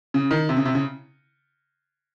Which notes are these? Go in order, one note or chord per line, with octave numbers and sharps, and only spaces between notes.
C#3
D#3
C3
C#3
C3
C#3